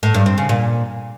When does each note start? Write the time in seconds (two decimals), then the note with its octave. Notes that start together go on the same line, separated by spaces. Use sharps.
0.03 A2
0.14 G2
0.26 C4
0.38 C#3
0.49 A#2